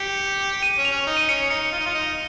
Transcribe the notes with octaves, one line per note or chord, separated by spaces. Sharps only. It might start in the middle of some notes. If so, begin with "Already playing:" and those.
Already playing: G4 C#7
D#7
C#4
F7
C#4
D#4
D#7
C#4 C#7
D#4 C#7
F4
D#4
F4
D#4